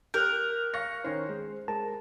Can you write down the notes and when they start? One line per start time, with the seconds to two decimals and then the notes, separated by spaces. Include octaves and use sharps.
0.14 G4 A#4 F#6 G6
0.74 F5 C#6 A#6 C#7
1.04 D#3 C#4 C5
1.29 G#3
1.68 G#3 A#4 A5